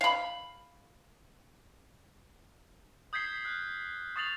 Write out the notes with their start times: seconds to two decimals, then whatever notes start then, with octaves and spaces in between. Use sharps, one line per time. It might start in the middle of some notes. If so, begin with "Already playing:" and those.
0.01 F5 B5
3.13 D#6 G6 G#6 B6 C7 G7
3.45 F6 F#6
4.16 C#6 D#6 A6 C7 F7 F#7